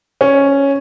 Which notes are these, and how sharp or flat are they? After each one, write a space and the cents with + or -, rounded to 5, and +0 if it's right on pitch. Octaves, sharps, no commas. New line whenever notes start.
C#4 +0